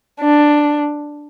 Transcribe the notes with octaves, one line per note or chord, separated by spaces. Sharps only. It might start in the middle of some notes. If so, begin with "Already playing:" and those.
D4